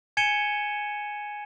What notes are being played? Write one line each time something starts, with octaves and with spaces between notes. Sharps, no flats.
G#5 G#6 C#7 D#7 E7 G7